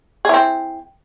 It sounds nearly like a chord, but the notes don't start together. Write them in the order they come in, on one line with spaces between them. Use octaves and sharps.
G#4 E4 C4